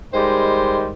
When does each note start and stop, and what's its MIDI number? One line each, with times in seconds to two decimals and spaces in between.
0.13 0.92 51
0.13 0.92 55
0.13 0.92 56
0.13 0.92 72